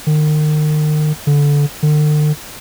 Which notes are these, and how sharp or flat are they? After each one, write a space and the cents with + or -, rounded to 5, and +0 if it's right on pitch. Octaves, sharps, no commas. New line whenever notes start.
D#3 -35
D3 -20
D3 +45